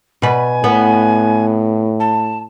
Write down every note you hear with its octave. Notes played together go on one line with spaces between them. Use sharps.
B2 B4 G#5
A2 B3
A5